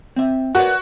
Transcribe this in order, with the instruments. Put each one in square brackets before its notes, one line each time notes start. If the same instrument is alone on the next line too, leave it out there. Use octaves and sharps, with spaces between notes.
[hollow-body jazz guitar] C4 E5
[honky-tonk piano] F#4 [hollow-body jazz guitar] A#4 B4 D5